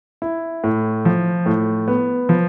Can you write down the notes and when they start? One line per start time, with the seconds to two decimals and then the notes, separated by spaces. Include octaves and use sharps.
0.22 E4
0.64 A2
1.05 F3
1.46 A2
1.88 B3
2.29 F3